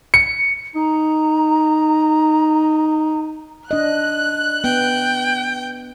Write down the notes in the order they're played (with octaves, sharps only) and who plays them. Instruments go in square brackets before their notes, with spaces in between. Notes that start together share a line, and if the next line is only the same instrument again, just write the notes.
[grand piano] C#7
[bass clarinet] D#4 [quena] A#5
[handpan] D4 D#5 [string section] F#6
[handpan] B3 [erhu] G5